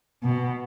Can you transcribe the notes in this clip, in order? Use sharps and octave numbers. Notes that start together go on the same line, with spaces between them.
B2